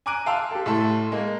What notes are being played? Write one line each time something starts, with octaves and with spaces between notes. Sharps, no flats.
G#5 A#5 D6 F#6 D7 D#7
F5 G5 A5 C6 E6 F6
G4 A4
A2 A3 A4 C6
G#3 A#3